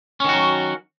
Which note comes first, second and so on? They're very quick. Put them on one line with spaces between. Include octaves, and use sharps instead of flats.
C#4 D#3 F#4 F#3